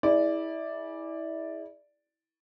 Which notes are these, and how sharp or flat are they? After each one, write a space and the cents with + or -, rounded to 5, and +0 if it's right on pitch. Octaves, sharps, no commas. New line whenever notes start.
E4 -25 G#4 +0 D5 +0